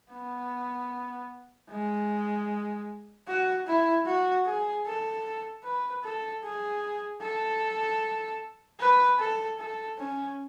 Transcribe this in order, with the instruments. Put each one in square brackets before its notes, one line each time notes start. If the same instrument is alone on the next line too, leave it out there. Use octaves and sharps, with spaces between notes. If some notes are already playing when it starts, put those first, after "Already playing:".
[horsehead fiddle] B3
G#3
F#4
E4
F#4
G#4
A4
B4
A4
G#4
A4
B4
A4
A4
C#4